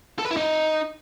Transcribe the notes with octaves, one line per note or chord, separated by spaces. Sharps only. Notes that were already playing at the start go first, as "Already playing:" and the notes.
A4
B4
E4
D#4